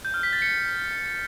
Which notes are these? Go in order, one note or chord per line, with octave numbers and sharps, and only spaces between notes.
G6
F6
B6
A6
C#7